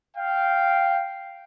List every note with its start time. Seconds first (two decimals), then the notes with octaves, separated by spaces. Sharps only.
0.17 F5 G5